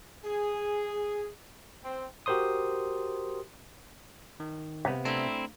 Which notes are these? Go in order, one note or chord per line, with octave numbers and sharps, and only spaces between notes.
G#4
C4
F#4 G4 A#4 C5 C6 D#6
D#3
C3 B3 F5
A3 C4 D4 E4 A#5